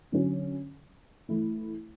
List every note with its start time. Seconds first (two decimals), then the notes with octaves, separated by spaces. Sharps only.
0.12 D3 F#3 C#4
1.29 E3 A3 E4